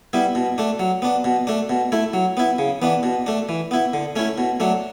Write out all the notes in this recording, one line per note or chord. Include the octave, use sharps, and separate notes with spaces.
G3 B3 E4
B2
A3 D4
F#3
B3 D4
B2
A3 D4
B2
A3 E4
F#3
B3 E4
C#3
E3 B3 D4
B2
A3 D4
E3
B3 E4
D3
A3 C#4 E4
B2
F#3 A3 D4